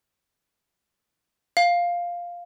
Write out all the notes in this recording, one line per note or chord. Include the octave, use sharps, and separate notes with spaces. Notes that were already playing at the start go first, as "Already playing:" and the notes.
F5